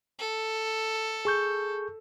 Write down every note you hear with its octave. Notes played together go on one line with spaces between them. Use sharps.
A4
G#4 C#6 G6